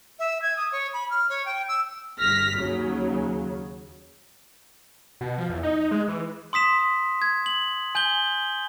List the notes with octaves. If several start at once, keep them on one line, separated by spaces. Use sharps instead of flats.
E5
G#6
D#6
C#5
B5
F6
C#5
G5
E6
G1 F6 A#6 B6
D#2 C#3 F#3
B2
F3
E2
D#4
G#3
E3
C6 D#6 B6 E7
G#6
F#7
G#5 G6 F#7 G7